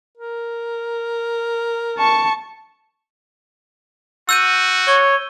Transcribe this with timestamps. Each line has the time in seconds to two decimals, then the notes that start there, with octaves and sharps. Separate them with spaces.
0.17 A#4
1.98 A5 C#6
4.29 F#4 E6 G6 D#7
4.88 C#5 G7